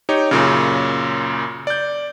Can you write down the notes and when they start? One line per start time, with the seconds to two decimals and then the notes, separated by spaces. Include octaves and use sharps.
0.09 D#4 G4 C#5
0.31 F#2 A#2 C#3
1.67 D5 G6